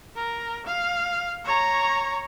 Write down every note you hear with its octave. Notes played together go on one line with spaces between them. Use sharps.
A#4
F5
C#5 A#5